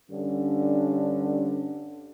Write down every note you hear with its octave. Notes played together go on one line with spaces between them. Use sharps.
G2 D3 C#4